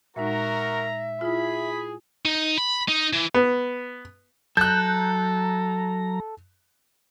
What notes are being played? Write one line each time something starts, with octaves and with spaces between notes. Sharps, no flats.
A#2 G#3 D#4 F#4 A#4 E5 A#5
E4 F4 G#4 B5
D#4
B5
D#4
E3
B3
F#3 A4 A#5 F#6 G6